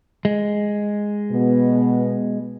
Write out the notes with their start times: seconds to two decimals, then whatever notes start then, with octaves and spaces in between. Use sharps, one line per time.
0.25 G#3
1.31 B2 B3